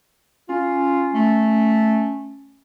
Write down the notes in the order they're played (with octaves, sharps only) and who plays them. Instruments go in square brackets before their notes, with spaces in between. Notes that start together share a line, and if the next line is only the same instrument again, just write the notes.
[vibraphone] C#4 G#5 [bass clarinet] F4
[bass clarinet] A3